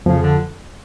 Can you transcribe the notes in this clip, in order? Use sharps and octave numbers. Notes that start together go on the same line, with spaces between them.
F2 C#3 F3
D3